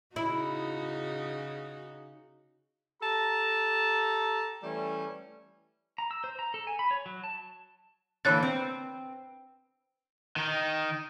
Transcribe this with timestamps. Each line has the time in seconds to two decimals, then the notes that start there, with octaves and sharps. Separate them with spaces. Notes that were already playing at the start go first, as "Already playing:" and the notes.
0.16 C#3 D#4 E4 F#4
3.02 G4 A4 A5 A#5
4.62 E3 G3 A3 C#4
5.98 A#5
6.11 E6
6.24 C5
6.39 A#5
6.54 A4
6.67 G#5
6.79 B5
6.91 C#5
7.06 F#3
7.24 A5
8.25 D3 E3 A#3 C#5 F#6 A6
8.43 C4
10.36 D#3 D#4